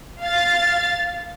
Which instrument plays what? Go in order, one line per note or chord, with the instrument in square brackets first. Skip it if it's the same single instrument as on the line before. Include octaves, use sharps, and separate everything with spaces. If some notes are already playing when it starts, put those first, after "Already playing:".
[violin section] F5 A6